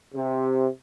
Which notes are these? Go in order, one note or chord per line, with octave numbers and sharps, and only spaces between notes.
C3